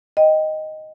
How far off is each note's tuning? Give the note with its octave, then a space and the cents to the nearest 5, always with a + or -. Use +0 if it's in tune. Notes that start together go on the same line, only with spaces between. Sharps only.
D#5 +0 G5 +0